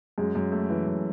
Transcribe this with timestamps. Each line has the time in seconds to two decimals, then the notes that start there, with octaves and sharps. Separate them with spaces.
0.18 F#2 G#3
0.35 F#2
0.52 A3
0.70 E3
0.86 F#2